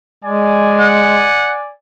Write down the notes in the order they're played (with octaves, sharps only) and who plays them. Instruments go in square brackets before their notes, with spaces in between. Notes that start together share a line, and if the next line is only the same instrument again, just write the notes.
[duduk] G#3 [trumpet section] D5 G#5
[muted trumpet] F#5